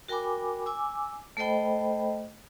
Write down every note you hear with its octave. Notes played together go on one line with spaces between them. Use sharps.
F#4 A#4 G5 G#5 B5 D6
G#5 D6 E6
A3 A4 C5 D#5 G5 B5